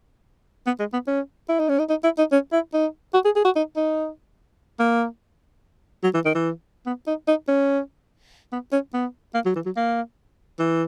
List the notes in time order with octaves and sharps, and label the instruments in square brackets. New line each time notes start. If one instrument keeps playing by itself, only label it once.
[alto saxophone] B3
G#3
B3
C#4
E4
D#4
C#4
D#4
D#4
E4
D#4
C#4
E4
D#4
F#4
G#4
G#4
F#4
D#4
D#4
A#3
F#3
E3
D#3
E3
B3
D#4
D#4
C#4
B3
C#4
B3
A#3
F#3
E3
F#3
A#3
E3